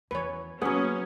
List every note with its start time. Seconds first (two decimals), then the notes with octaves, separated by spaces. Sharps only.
0.11 E2 D#3 B4 C#5
0.62 D#3 F#3 A#3 B3 C#4 G#4